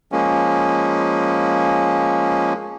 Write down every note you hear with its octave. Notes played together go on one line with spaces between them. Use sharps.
F3 G#3 A#3 C#4